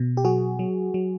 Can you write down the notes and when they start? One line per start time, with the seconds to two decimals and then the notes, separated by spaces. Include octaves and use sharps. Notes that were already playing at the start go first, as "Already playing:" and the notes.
Already playing: B2
0.17 G4
0.25 F#3 F#4 G#4
0.59 F#3
0.94 F#3